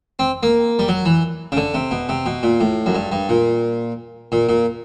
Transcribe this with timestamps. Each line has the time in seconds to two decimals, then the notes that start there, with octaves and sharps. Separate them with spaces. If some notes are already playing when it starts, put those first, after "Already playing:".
0.19 C4
0.43 A#3
0.79 G3
0.88 F#3
1.05 E3
1.52 C#3
1.57 D3
1.74 C3
1.91 B2
2.09 C3
2.26 B2
2.43 A#2
2.60 A2
2.86 F#2
2.95 G2
3.12 G2
3.29 A#2
4.32 A#2
4.49 A#2